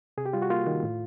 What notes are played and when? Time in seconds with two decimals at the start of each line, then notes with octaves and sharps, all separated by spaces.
0.18 C3 G#4
0.26 G4
0.33 G3 F4
0.42 F#4
0.50 A#3 F4
0.67 D#3
0.83 A2